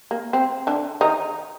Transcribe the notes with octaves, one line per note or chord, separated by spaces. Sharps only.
A#3
C4
D3 D4
D#3 D#4